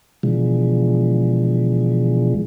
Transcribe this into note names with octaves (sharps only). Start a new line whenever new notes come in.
B2 D3 E3 F3 G#3